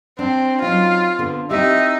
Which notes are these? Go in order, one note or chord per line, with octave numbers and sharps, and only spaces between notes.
C4 D4
F#3 C#4 D#4 F4
D3 B3
C4 D#4 E4 G4 E5